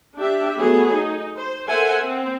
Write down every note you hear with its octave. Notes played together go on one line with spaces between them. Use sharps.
D4 G4 E5
F#3 A3 B3 G#4
D#4
C5
A4 A#4 C5 E5 F#5 G#5
C4